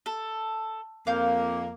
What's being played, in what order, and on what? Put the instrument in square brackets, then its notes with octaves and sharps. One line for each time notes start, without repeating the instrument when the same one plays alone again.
[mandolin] A4
[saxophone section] F2 A#3 [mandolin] F5 G6